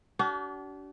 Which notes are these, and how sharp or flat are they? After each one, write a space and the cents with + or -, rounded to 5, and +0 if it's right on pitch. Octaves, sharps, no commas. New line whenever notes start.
D4 -35 F#4 +45